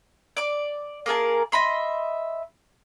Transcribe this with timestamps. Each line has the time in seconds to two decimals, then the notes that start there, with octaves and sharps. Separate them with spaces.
0.37 D5 D6
1.06 A#3 G#4 A#4 A5
1.52 D#5 E5 B5 C6